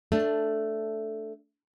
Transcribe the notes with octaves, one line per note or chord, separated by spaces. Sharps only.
A3 D4